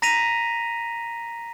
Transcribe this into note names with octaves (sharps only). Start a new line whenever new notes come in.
A#5 A#6 B6 D#7 F7